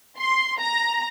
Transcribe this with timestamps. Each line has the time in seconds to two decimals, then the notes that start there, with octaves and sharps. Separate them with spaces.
0.17 C6
0.59 A#5